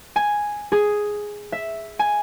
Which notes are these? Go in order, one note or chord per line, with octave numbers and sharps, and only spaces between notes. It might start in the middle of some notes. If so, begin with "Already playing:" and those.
G#5
G#4
E5
G#5